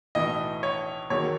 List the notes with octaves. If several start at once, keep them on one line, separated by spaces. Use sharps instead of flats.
B1 A2 E3 D#5
C#5
E2 D#3 F#3 C#5